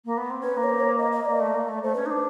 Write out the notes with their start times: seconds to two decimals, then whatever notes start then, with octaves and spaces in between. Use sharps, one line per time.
0.05 A#3
0.17 B3
0.30 C4
0.43 C#4 B4
0.57 A#3
0.64 C#5
0.70 C5
0.80 C#5
0.98 D#5
1.12 D#5
1.26 A#3 D5
1.40 A3
1.54 A#3
1.68 A3
1.83 A3 C5
1.94 C#4 B4
2.06 D4 D#4 C5